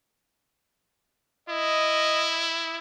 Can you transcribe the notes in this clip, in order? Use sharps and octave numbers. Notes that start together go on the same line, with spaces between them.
E4 D#5